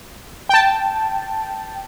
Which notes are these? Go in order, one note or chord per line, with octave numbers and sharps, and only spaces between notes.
G5 A5